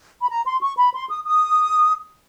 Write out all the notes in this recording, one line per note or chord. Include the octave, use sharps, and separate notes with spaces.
B5
A#5
C6
C#6
B5
C6
D#6
D#6